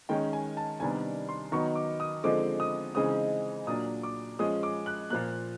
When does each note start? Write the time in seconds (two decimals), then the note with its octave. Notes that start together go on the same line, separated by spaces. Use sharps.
0.09 D#3 G#3 C#4 G5
0.33 G#5
0.57 A5
0.80 C3 D#3 G3 B3 D4 G#5
1.29 C6
1.52 D#3 F#3 B3 D#4 C#6
1.75 D6
2.00 D#6
2.23 D3 F3 G#3 C4 D#4 D6
2.60 D#6
2.95 C#3 E3 G#3 C4 D#4 D#6
3.67 A#2 F#3 A#3 D4 D#6
4.03 D6
4.39 F3 G#3 C#4 D#6
4.63 D6
4.86 F#6
5.10 A#2 F3 A#3 F#6